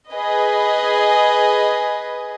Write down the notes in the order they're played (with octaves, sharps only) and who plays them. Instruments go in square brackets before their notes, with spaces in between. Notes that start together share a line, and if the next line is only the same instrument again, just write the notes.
[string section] G#4 B4 D#5